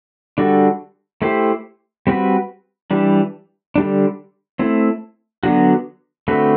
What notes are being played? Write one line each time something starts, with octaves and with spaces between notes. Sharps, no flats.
D3 G3 D4 F#4 A4
A3 E4 G4 C5
G3 C4 F#4 B4
E3 G3 D4
D3 G3 D4
A3 C4 E4
D3 F#3 B3 D4 F#4
D3 A3 C4 F#4 B4